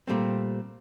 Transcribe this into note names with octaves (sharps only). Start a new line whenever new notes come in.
A#2 G3 A3 C4